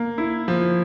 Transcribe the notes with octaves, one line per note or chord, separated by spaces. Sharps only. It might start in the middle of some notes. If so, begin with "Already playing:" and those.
Already playing: A#3
E4
F3